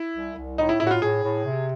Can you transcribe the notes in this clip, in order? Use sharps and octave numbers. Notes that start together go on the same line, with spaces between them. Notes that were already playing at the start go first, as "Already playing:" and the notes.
Already playing: E4
C2
C2
A2 D#4
E4
A2 E4
F#4
F4
A2 G#4
A2
C3